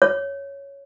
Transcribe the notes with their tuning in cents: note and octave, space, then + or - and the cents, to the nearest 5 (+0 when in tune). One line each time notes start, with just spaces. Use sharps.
C#5 +5